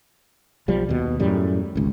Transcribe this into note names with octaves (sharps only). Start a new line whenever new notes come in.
B1 F3 G3
D#2 B2
F#2 A2 G3
G#1 C#2